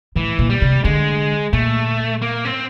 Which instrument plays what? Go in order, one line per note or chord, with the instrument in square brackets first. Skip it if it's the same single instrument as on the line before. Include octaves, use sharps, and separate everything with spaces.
[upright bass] A2 [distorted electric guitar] E3
[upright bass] A#2
[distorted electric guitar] G3
[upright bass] C3
[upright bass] D3 [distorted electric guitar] G#3
[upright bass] A#2 [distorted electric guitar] A3
[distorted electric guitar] A#3
C4